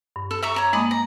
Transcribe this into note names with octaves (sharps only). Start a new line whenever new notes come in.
G2
A4
E5 A#5 C#6
C#5 A#5 D6
G#3 A#3 D5 D#5 A5 B5
A#5